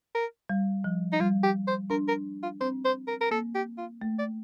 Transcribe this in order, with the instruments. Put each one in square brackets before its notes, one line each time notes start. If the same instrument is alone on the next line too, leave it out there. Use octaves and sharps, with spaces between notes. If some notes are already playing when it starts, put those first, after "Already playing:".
[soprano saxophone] A#4
[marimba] G3
F3
[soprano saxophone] D#4
[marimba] G3 [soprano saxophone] F4
[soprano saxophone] G4
C5
[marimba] D4 [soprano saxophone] A#4
[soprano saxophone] A#4
F4
[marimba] C4 [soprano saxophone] C5
[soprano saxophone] C5
A#4
A#4
[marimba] A#3 [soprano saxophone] A4
[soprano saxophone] G4
F4
[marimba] A3
[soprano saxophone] D5